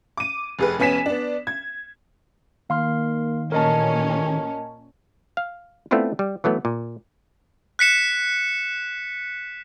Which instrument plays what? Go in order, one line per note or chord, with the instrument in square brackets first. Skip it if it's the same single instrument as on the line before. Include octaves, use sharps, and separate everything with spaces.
[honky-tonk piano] D6 D#7
F1 G#4 B4
F1 B3 C#4 G#5 B6 E7
B3 D4
G#6
[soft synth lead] D#3 [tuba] A#3 [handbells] F5 C6 F6
[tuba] A1 [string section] A#2 C#4 [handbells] A#4 D#5 A5
[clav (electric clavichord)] F5
A3 B3 C4 D4 E4 F4
G3
E3 F#3 A3 B3
A#2
[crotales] F#6 B6 C#7 E7